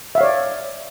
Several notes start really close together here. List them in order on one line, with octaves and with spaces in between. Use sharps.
E5 F5 C#5 D5